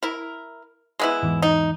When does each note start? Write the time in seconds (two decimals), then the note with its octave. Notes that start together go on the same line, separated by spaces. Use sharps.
0.03 E4 A#4
1.00 G#3 B3 E4
1.23 E2 G#2 E3
1.42 D#4